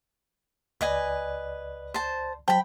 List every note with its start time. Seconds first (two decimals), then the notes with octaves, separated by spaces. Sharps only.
0.81 C#2 B4 D5 D#5 G#5
1.94 C5 A5
2.48 F#3 C5 G5 A5 B5